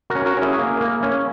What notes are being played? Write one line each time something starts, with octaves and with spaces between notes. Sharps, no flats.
F#4 A#4
C#4
F#4 A#4
C#4
E4 G#4
A#3
A#3
C#4